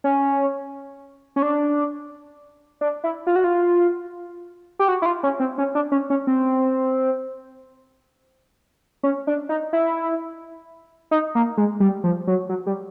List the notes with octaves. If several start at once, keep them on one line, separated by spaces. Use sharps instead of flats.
C#4
C#4
D4
D4
E4
F4
F#4
F4
G4
F#4
E4
F4
C#4
C4
C#4
D4
C#4
C#4
C4
C#4
D4
D#4
E4
D#4
A#3
G#3
G3
F3
F#3
F#3
G3